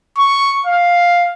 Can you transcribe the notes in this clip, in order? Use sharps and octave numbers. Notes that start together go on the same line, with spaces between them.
C#6
F5